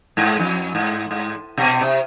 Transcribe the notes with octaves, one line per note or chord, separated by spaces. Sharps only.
G#2
F2
G#2
G#2
B2
C3